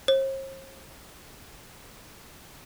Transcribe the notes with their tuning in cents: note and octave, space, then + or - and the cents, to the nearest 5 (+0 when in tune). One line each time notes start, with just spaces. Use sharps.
C5 +45